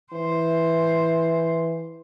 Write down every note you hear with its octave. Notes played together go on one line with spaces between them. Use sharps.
E3 C5